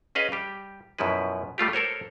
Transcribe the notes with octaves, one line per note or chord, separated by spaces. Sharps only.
C#4 G#4 B4 D#5 F5
G3 G4
F#2 B2 F3 F#3 E4 B4
G3 A3 F4 G4
A4 A#4 C5 C#5